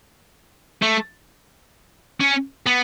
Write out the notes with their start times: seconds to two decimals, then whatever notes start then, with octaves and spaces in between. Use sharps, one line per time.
0.82 A3
2.20 C#4
2.67 B3